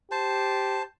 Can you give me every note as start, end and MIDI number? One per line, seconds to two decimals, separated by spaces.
0.11 0.84 67
0.11 0.83 72
0.11 0.83 81